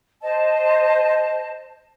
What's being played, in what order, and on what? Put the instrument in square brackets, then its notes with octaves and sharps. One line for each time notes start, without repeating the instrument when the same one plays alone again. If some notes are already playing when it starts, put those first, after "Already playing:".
[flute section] C5 D#5 A5